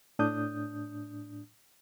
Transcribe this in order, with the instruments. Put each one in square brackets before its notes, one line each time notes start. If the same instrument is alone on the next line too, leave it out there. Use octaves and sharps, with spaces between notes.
[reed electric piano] A2 D4 D#6 G6